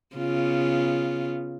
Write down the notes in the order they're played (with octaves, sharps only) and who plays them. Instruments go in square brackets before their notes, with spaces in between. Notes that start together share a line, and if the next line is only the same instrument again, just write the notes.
[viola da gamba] C#3 B3 F4